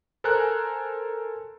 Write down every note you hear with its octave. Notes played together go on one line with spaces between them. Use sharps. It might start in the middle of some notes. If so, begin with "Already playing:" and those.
A4 A#4 C5 G#5 A#5 F#6